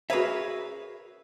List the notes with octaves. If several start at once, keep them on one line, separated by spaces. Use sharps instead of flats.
F#4 G#4 A#4 B4 C#5 E5